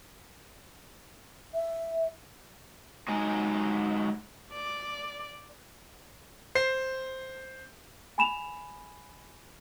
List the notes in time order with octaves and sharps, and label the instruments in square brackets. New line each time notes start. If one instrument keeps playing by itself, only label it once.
[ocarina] E5
[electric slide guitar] F#3 G#3 D#4 G#5
[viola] D5
[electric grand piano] C5 C7
[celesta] G#5 B5 E7 F7